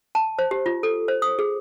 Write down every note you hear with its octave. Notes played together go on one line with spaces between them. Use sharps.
A5
C5
G4
F4
A4
C5
D#6
G#4